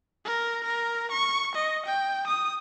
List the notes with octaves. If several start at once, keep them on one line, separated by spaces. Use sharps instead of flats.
A#4
A#4
C#6
D#5
G5
D#6